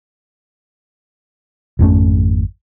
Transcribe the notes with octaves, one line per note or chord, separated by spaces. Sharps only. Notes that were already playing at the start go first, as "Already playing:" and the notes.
G#1 F2 A3 C#4